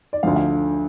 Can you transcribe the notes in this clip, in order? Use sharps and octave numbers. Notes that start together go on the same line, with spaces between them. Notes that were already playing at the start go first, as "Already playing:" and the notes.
D5
D2 D3 F3 F5
F5